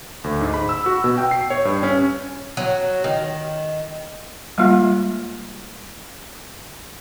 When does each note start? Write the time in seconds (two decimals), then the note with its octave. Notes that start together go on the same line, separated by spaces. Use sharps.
0.24 D2
0.41 G#2
0.54 B5
0.69 E6
0.86 F#4
1.04 B2
1.18 G5
1.31 C7
1.50 C#5
1.65 G2
1.83 C#4
2.57 F#3
3.04 D#3
4.58 G3 G#3 A#3 F4